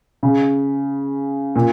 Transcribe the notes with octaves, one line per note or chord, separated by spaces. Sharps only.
C#3
A#2